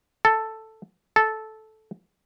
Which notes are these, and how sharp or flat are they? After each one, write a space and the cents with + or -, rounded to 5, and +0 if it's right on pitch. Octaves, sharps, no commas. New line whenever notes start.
A4 +5
A4 -10